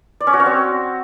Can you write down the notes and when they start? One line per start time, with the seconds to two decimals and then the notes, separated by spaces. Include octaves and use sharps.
0.20 D5
0.27 C#4
0.33 F#4
0.40 C#5
0.46 C4